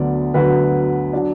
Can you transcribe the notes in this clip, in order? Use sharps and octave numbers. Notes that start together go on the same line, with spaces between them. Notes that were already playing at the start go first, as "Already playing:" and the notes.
Already playing: D2 D3 F#3 B3 D5
D2 D3 F#3 B3 B4
F#3 D4